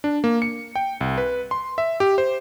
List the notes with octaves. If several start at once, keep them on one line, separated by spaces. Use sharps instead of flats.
D4
A#3
C#7
G5
C2
B4
C6
E5
G4
C5